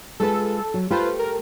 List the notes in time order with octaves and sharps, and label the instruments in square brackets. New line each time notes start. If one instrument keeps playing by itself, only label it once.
[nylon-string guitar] G#3 F4 B4 [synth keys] A4
[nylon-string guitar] F#3 F#4
[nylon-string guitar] A3 G4 A4 [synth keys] F4 B4 C5
[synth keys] A#4